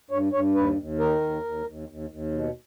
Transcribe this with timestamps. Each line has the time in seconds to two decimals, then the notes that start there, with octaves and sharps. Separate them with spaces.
0.11 G2 C#5
0.33 G2 C#5
0.55 D#2 B4
0.77 D#2
0.99 D#3 A#4
1.21 D#2
1.44 D#2
1.66 D#2
1.88 D#2
2.10 D#2
2.32 B2